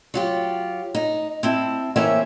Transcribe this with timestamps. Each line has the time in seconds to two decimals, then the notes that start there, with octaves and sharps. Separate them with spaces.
0.14 F#3 F4 G4
0.95 D#4
1.43 C4 E4 A5
1.96 E3 A#3 C#4 G4 C5 E5